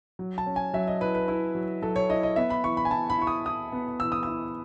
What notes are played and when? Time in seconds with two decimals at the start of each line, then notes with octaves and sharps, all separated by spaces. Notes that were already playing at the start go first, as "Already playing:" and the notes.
0.19 F#3
0.38 A5
0.46 C#4
0.56 G#5
0.74 F#3 E5
0.88 D#5
1.01 E4 B4
1.15 B4
1.28 E4
1.55 F#3
1.82 F#3 A4
1.96 C#5
2.09 E4 D#5
2.23 D#5
2.36 B3 E5
2.50 B5
2.64 E3 C#6
2.77 B5
2.85 G#5
2.91 E4 A5
3.10 B5
3.18 E4 C#6
3.27 D#6
3.46 E4 D#6
3.72 B3
4.00 E3 E6
4.12 D#6
4.23 E4 E6